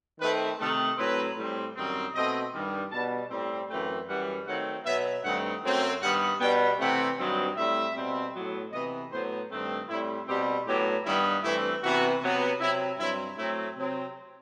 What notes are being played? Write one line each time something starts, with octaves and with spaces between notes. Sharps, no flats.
D#3 A3 C4 B4
C3 D#3 A3 A4
A2 F#3 C4 B4
A2 G3 C4
F#2 D#3 G3 C4
B2 A3 C4 D#5
G2 D#3 G3
B2 G3 B3 A5
A2 G3 C4
F#2 E3 A3 C4 G5
F#2 E3 G3 F#5
D#3 F#3 A3 C4 F#5
B2 F#3 B3 E5
G2 D#3 A3 C4 F#5
F#2 F#3 A3 C4
G2 D#3 G3 B3 F#5
B2 G3 B3 G5
C3 E3 A3 C4 F#5
G2 D#3 F#3 C4
A2 G3 C4 E5
B2 G3 C4
A2 F#3 B3
C3 E3 B3 D#5
A2 F#3 B3 C5
G2 D#3 A3 C4
A2 G3 C4 E4
B2 G3 C4 G4
A2 F#3 B3 G4
G2 D#3 G3 B3 E4
G2 E3 A3 C4 E4
C3 E3 B3 F#4
C3 F#3 B3
C3 F#3 C4 E4
G2 F#3 C4 E4
A2 F#3 A3 C4 E4
C3 F#3 C4